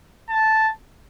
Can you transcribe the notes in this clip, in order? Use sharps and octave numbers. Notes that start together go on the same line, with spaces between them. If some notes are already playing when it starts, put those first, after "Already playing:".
A5